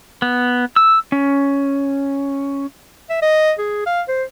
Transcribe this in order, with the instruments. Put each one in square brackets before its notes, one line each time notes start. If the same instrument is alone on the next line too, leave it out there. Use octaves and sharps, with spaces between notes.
[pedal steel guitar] B3
E6
C#4
[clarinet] E5
D#5
G#4
F5
C5